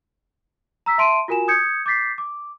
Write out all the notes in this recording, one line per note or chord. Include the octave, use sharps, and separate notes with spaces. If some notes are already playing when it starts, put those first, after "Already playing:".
A#5 E6 B6
E5 A5 C6 D7 D#7
F4 F#4 A#4 G#5 E7
D#6 G6 G#6 C#7
D6 G6 A6 B6 C7
D6